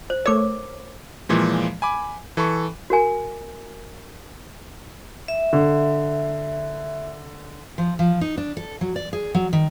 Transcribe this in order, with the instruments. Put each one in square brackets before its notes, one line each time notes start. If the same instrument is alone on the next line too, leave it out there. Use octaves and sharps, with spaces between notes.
[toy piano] C5
[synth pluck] A3 C#5 [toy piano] A#4 D6
[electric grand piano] A#2 E3 F3 G#3
G#5 B5 D6
E3 A4 B5 C#6
[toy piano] F#4 A#4 G#5
[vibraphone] E5
[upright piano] D3
[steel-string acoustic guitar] F3
F3
D#4
D4
A4
F#3
D5
G#4
F#3
D#3